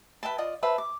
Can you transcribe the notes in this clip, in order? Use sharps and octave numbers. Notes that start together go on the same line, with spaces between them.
B4 E5 G5 A5
F4 D5 D#5 D#6
B4 C5 E5 A5
D6